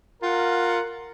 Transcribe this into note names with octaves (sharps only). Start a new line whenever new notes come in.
F4 A#4 F#5